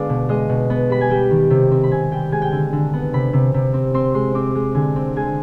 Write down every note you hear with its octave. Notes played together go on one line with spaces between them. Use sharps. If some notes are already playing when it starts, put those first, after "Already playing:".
Already playing: D3 G#3 B3 D5 F5
B2
G#3 D#5
B2
B3
G3 B5
G#5
G3 G5
D#3
C3
C4
B5
C4 G#5
G3 G5
G#3 G#5
G5
D3 G#5
D3
B3
C3 B5
C3
C3
C4
C4 C6
G#3 C6
C4 D6
G#3
D3 G#5
C4
G#3 G#5